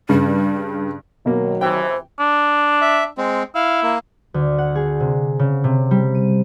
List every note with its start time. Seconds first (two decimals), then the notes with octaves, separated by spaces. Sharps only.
0.09 G2 C#3 G3
1.26 B2 D#3 F#3 A#3
1.61 C#2 C3 E3 C5 G5
2.19 D4
2.81 E5
3.18 G#3 C4
3.55 E4 F5
3.83 A#3
4.34 D2
4.58 F#5
4.75 G#4
5.00 C3
5.39 C#3
5.64 C3
5.91 G3
6.15 D#7